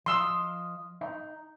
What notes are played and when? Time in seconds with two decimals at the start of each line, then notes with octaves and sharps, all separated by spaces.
0.06 F3 F4 D#5 C6 E6
1.01 D#4